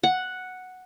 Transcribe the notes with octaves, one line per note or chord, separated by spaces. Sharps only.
F#5